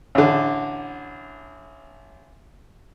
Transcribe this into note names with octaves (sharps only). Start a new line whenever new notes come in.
A1 D3